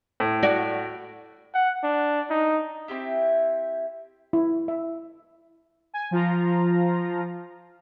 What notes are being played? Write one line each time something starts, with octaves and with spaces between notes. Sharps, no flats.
A2
F#4 D5
F#5
D4
D#4
C4 E4 G4 E5
E4
E5
G#5
F3 F4 A#5